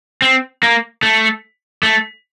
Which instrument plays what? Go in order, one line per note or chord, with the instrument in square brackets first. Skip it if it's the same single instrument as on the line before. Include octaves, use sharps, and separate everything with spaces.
[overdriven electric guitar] C4
A#3
A3
A3